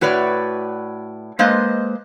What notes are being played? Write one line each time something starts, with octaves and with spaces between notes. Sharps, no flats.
A2 F#4 B4 C#5 D5
G#3 A#3 B4 C5 D#5